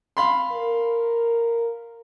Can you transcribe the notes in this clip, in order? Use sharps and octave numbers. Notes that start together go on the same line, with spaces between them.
F5 B5 C6
A#4